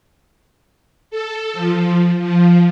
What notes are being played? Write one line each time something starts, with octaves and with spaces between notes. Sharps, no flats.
A4
F3
F3